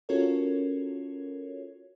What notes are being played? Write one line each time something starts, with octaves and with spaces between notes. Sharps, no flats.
C#4 F4 F#4 A4 A#4 C#5